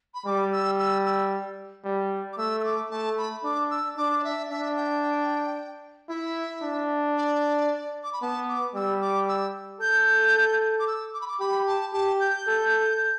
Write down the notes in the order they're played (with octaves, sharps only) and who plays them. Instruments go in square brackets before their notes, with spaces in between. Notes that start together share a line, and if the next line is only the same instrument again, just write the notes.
[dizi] B5
[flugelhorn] G3 [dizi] D6
[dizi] E6
E6
E6
[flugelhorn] G3
[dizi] D6
[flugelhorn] A3 [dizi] E6
[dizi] E6
D6
[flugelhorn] A3 [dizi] A5
[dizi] B5
[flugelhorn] D4 [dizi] D6
[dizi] E6
[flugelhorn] D4 [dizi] D6
[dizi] D5
E5
[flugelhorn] D4 [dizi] E5
[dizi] G5
[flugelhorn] E4 [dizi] E5
[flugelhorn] D4
[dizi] D5
D6
B5
[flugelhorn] B3 [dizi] A5
[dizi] D6
[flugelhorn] G3 [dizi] E6
[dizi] D6
E6
[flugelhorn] A4 [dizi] G6
[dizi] D6
E6
D6
B5
D6
[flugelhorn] G4 [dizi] B5
[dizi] A5
[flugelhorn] G4 [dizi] A5
[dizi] G6
[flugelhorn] A4